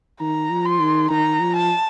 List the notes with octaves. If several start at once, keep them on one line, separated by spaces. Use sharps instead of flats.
D#3 A#5
F3
C6
D#3
D#3 A#5
F3
A5